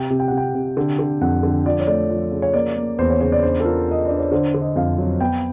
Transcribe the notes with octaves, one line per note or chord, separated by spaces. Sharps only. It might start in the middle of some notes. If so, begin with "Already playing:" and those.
Already playing: C3 G5
C3
G5
C3 F#5
G5
C3
D3
D3
F2 F#5
D3
F3 D5
C#5
A3 D5
F3
C#3
C#5
A#3 D5
A#3
E2 C5
C#5
C#3 C#5
D5
D4 C5
A4
F4 A#4
F4 D#5
D4 D5
C#5
D3 C5
D3
D#5
F2 F5
F#3
B3 G5